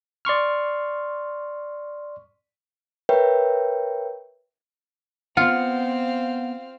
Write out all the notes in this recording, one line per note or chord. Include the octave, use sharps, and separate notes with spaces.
D5 C6 C#6 F6
A#4 B4 C#5 E5 G5
B3 C4 F4 F5 F#5